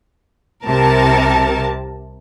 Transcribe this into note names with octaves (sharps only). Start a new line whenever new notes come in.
C2 C3 A#4 A5